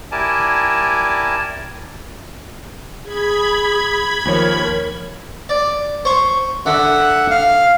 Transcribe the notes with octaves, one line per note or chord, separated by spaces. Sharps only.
E4 G4 A#4 D5 G#5 A5
G#4 B5 G#6
D#2 F3 A#4 C#5
D5
C5 C#6
D3 E5 F#5
F5